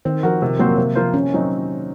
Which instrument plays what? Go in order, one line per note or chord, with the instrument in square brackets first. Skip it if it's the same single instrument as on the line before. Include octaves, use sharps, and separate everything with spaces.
[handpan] D#3 [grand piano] C4
[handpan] F3 [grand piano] F#4 A#4
[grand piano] C3
[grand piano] F#3 C4 F#4 C5 [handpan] A#3
[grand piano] C3
F3 A#3 F4 C5
[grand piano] C3 [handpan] C#4
[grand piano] D#3 F#3 C4 D#4